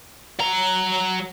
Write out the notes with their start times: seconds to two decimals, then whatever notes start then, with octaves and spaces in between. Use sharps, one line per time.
0.40 F#3 A#5